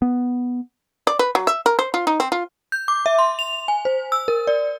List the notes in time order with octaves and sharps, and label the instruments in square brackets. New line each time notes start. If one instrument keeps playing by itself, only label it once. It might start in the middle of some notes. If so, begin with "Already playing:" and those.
[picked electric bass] B3
[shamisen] D5
B4
F#3
E5
A#4
C5
F4
D#4
C4
F4
[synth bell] G6
D6
E5
C6
F7
G#5
C5
E6
A#4
D5